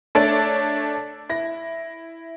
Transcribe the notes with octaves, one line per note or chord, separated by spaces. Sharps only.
A3 D4 A4 C#5 D5 A5
E4 A#6